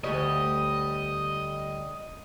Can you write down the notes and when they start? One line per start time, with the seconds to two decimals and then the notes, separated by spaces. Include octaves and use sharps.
0.04 D2 G3 C#5 D#5